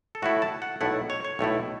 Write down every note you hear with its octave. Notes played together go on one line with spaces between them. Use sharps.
A4
A2 A3 E4 F#4
A5
F#5
B1 A2 A3 E4 F#5
C#5
C#5
B1 A2 A3 E4